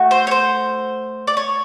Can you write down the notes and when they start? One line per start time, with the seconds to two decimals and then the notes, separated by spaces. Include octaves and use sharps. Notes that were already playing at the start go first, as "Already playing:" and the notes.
Already playing: A3 F#4
0.11 C5
0.27 C#5
0.31 C5
1.27 D5
1.37 C#5